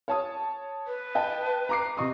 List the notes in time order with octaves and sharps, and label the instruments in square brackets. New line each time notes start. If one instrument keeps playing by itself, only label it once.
[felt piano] C#5 A5 D#6
[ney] B4
[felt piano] D#5 G5 A5
A#5 D6 C7
[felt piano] C3 C#6 D#6 [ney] D#5